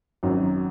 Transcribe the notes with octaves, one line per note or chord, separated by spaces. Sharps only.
G#1 F#2 D#3 F#3